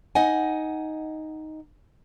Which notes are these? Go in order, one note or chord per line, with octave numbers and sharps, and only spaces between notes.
D#4 D#5 F#5 G#5